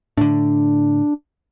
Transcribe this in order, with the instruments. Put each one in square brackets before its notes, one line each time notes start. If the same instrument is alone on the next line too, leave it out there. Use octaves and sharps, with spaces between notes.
[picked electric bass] A2 D3 [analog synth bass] D4